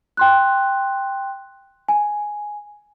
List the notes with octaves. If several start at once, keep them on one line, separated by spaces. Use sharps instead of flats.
G5 C6 F#6
G#5